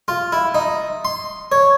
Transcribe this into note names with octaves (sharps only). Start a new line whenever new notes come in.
F4
E4
D#4
C6
C#5